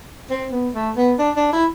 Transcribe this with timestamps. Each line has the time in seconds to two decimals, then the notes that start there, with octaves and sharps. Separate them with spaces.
0.30 C4
0.52 B3
0.74 A3
0.97 B3
1.18 D4
1.36 D4
1.53 E4